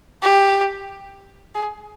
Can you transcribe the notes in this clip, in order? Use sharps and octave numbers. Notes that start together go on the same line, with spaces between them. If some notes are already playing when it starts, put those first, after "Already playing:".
G4
G#4